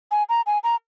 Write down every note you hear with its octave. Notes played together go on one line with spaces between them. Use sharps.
G#5
A#5
G#5
A#5